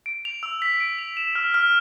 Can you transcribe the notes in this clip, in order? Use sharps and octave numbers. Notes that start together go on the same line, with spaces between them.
D7
F7
E6
B6
D7
F7
E7
F6
F6